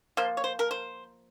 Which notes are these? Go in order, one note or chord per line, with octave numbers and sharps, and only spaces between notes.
F3 A#3 F4 C5
C#5
C5
A#4
C5